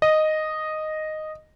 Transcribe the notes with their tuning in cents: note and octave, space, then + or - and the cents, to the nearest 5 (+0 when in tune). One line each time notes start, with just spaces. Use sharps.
D#5 -5